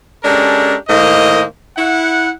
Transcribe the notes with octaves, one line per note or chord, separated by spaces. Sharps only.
G#3 C#4 D4 G4 A4 A#4
A2 D#3 A#3 C5 D#5
E4 F#5